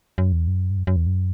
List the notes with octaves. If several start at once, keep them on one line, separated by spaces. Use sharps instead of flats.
F#2
E2
F#2
G2
F#2
F#2
E2
F#2